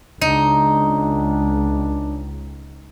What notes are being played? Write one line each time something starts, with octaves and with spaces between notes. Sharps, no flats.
C#2 D4 D#4